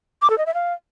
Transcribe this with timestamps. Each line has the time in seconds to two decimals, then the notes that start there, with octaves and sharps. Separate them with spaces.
0.22 D6
0.30 A4
0.38 D#5
0.46 E5
0.54 F5